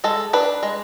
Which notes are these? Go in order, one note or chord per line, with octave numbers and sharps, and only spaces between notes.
G#3 A4
D4 B4
G#3